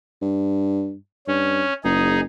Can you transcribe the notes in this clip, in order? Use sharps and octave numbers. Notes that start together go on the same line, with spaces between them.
G2
G2 C#4
F#1 D#4 G#4